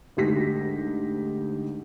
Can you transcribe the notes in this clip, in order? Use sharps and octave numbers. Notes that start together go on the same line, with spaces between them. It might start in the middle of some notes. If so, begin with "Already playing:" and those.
D2 G#2 G4 A#6 B6